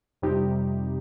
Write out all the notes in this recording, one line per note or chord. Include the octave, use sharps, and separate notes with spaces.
F2 C3 G3 D#4 G4